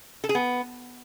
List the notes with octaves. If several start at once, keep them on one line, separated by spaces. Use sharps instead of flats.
A4
G#4
B3